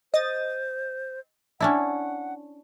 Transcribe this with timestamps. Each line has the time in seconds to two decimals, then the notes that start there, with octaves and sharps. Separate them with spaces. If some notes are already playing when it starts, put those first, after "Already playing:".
0.14 C5 D#5 D#6 A6
1.60 C#4 D4 E4 F#5